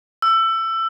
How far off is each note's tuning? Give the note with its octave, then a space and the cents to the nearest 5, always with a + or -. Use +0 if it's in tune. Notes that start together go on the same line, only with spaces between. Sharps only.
E6 +20